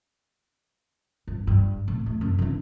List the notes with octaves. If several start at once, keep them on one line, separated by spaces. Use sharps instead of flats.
G2
G2
A2
A3
F#2
D3 D4